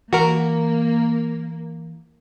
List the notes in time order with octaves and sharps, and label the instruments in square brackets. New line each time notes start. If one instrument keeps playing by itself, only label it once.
[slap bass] E3 [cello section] A#3 [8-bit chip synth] F#4 A#4